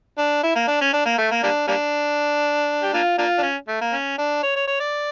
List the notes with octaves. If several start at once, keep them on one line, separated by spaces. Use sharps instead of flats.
D4
E4
A#3
D4
C#4
D4
A#3
A3
A#3
G3 A#3 D4
G3 A#3 D4
G4
A#3 D4 F4
A#3 D4 F4
D4
C#4
A3
A#3
C#4
D4
C#5
C#5
C#5
D5